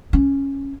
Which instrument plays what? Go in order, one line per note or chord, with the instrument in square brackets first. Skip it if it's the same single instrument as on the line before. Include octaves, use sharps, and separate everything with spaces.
[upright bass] C#4